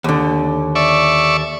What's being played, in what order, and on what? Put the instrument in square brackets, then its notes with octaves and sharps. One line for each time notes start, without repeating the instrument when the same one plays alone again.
[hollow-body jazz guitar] D#2 D3
[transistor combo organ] D5 E5 C#6